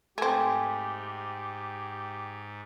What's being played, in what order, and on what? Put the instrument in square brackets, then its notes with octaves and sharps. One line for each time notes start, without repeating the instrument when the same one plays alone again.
[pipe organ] G#2 [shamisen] A3 C4 [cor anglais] G4 [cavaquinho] G#5